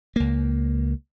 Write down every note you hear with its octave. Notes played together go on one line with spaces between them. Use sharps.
C#2 A#3